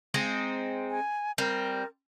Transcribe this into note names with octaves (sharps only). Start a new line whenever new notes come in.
G#3 C4 D#4
G#5
G3 C4 A#4